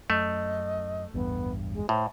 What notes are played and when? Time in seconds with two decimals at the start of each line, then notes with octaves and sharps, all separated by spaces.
0.10 F#2 A3 D#5
1.14 A1 E2 G2 B3
1.74 G#3
1.89 A2 C5